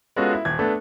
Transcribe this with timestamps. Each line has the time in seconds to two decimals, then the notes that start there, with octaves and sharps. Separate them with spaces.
0.16 G#3 B3 C#4 F4 F#4 A4
0.33 E4
0.45 D#1 G#6
0.59 A3 B3 D4 A4